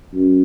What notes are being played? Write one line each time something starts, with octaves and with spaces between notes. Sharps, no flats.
F#2